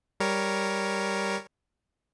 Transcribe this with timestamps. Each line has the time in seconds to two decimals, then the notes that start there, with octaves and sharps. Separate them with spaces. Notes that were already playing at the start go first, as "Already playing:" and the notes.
0.20 G3 A#4 C#5